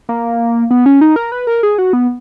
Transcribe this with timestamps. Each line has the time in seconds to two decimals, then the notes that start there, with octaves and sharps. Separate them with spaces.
0.09 A#3
0.71 B3
0.86 C#4
1.01 D#4
1.16 A#4
1.32 B4
1.47 A#4
1.63 G#4
1.78 F#4
1.93 B3